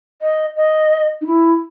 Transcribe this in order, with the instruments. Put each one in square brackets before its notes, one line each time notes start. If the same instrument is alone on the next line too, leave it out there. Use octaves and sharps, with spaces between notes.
[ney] D#5
D#5
D#4
E4